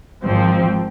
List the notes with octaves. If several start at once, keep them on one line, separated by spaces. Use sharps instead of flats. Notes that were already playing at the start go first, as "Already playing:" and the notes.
G#1 G#2 F3 C4